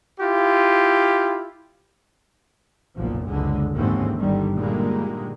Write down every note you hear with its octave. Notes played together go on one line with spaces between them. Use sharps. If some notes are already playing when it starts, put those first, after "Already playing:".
E4 F4 G4
F#1 B1 A#2 F3
F#1 C#2 D3 G#3
D#2 G#2 D3 E3 C4 C#4
G1 D3 D#3 G3
A#2 D3 D#3 G3 G#3 A#3